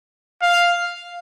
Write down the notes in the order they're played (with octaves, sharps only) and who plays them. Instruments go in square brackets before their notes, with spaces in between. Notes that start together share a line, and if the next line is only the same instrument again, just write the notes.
[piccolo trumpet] F5